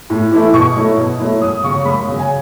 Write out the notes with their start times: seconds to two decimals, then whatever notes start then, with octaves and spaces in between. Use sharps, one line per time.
0.10 A2
0.32 E3 A3 E4
0.53 B2 C#6
0.76 F#3 A3 E4
0.97 B2
1.19 F#3 A3 E4
1.41 F#2 D#6
1.63 C#3 F#3 C#6
1.85 F#2 B5
2.07 C#3 F#3
2.19 G#5